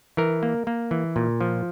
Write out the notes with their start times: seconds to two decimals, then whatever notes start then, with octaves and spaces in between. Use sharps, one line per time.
0.17 E3 A#4
0.43 A#3
0.67 A#3
0.91 E3
1.16 A#2
1.41 F3